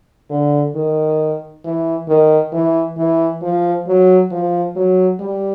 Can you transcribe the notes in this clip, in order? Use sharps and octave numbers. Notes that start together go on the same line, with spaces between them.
D3
D#3
E3
D#3
E3
E3
F3
F#3
F3
F#3
G3